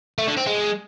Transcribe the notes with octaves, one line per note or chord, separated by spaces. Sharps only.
A3
D3
C4
G#3